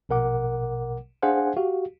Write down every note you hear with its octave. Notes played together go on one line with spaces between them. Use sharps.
A#1 B2 A#4 F#5 D6
D4 G#4 C5 F5 F#5 G#5
F#4 G4 F5